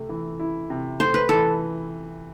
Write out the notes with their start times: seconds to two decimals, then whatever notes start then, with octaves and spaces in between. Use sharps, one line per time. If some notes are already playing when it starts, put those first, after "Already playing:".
Already playing: C3 A3
0.09 E3
0.40 E4
0.70 C3
1.00 A3 C5
1.14 B4
1.29 E3 A4